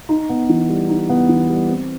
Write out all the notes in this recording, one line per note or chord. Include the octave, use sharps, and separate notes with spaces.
D#4
B3
E3
G3
D#4
B3
E3
G3
C4